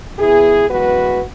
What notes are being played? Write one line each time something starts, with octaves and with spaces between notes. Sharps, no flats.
E2 E3 B3 E4 G#4
F#2 E3 G#3 B3 F#4 B4